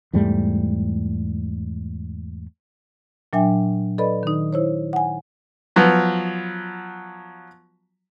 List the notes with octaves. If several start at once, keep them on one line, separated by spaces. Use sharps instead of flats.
E2 G#2 G3 A3
A#2 F#3 D4 E5 G5 G#5
A4 B4 D5 D#5 B5
D#3 D#4
E4 C5 C#5
F#5 G#5
F3 F#3 B3